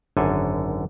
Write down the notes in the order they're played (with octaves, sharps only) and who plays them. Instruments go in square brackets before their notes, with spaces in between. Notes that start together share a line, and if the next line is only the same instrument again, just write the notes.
[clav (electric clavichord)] G#1 F#2 D3 A4 G#5